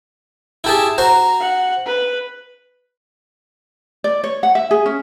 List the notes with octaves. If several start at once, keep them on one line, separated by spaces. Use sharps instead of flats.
E4 G4 G#4 A5
F#4 C5 A#5
F#5
B4
D5
C#5
F#5
E5
G#4
C#4